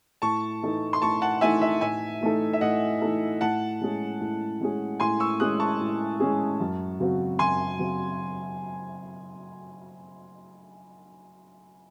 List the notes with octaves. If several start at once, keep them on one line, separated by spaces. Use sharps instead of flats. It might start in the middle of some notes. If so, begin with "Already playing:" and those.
A2 A5 C#6
E3 A3 D#4 A4
C6
A2 A5 C#6
F#5 A5
E3 A3 D#4 A4 E5 G#5
E5
A2 E5 G#5
E3 A3 D#4 A4
E5
A2 D#5 F#5
E3 A3 D#4 A4
A2 F#5 A5
G#3 C#4 G#4
A2
G#3 C#4 G#4
A2 G#5 C6
C#6 E6
G#3 C#4 G#4 D#6 F#6
A5 C#6
A2
G#3 C#4 G#4
F#2
C#3 F#3 C4 F#4
F#2 G#5 C6
C#3 F#3 C4 F#4